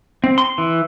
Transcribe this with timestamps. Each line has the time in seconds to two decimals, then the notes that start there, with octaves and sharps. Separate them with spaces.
0.24 C4
0.38 C6
0.58 E3